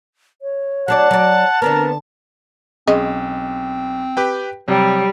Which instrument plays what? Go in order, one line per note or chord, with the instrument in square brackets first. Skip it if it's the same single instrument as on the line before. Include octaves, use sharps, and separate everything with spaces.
[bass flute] C#5
[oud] F#3 D4 D5 [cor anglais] F#5 [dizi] A5
[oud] F#3 D5
[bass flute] D3 [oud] B3 C4 D4 [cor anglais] A#4
[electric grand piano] B1 [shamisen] G#3 C#4 D#5 [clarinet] C4
[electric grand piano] G4 B4 G5
[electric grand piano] C3 [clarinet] F#3 [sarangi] G3